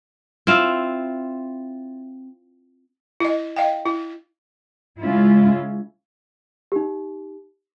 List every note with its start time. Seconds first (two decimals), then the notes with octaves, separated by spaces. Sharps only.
0.47 C4 E4 F4
3.20 E4 D#5
3.56 D#5 F5 G5
3.86 E4
5.00 C#3 G#3 C#4 E4 F4
6.72 D#4 G4